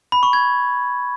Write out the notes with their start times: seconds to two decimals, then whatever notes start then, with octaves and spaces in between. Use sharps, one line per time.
0.12 B5
0.23 C#6
0.33 G#6